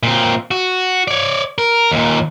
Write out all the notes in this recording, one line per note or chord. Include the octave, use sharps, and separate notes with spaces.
A#2 C4
F#4
C#5 D5
A#4
D#2 A#2